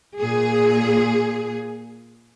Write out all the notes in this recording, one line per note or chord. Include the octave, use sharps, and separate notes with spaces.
A#2 G#4